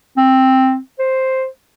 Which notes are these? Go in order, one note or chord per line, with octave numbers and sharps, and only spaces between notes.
C4
C5